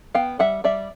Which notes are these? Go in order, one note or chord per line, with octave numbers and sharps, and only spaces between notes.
B3 F5 G5
G3 E5 F#5
G3 D5 E5